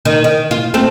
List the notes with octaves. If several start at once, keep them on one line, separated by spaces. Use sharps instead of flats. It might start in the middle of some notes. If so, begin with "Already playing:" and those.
D#3
D#3
F4
A3 C4 A4